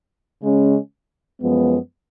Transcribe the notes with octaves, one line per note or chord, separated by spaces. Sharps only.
C#3 G#3 C#4
F#2 F3 G#3 B3